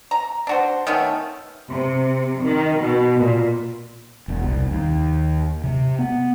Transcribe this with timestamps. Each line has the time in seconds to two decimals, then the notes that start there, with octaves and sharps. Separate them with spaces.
0.11 A#5
0.47 D4 F#4 C5
0.87 D#3 A3 B3 C#4
1.70 C3
2.44 D#3
2.79 B2
3.20 A#2
4.28 E1
4.43 C2
4.71 D#2
5.64 C3
5.99 B3